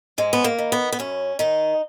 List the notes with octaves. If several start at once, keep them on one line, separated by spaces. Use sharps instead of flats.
G#2 G#3
B3
A#3
D#3
B3
B3
F#2 C#4
D#3 D#4